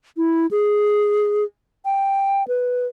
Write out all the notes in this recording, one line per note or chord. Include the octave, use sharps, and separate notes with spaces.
E4
G#4
G5
B4